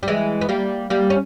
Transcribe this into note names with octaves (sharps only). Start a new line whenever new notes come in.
G3
E3 G#3
B3
G3 A#3
G3 A#3
C#4